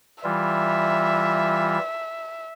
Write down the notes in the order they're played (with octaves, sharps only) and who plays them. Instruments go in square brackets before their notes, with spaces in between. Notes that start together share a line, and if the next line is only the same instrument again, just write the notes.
[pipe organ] E3 G3 F4 [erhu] E5